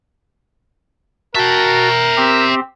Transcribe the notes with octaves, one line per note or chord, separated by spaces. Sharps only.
F#4 A#4 E5 G5 A5
C4 G4